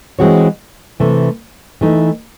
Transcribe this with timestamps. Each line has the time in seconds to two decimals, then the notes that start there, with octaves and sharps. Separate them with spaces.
0.19 E3 G#3 C4 F#4 C#5
1.00 C3 E3 A3
1.81 E3 A3 D#4